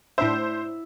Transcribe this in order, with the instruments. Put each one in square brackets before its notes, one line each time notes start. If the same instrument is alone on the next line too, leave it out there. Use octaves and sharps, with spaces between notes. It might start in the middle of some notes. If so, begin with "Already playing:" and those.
[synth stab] A2 D4 [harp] E4 E5 [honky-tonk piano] C5